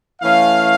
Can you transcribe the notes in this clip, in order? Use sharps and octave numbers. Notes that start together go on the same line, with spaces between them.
E3 A3 C#4 F5